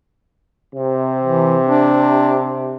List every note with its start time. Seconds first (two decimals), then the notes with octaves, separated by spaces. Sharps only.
0.75 C3
1.23 E3
1.67 D4